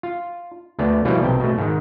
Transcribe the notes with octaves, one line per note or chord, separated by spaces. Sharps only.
F4
D2 A3 B3 D5
B2 E3 F3 G3 A#3 E4
B1 C3 G5
B2 A3
G#2 D#3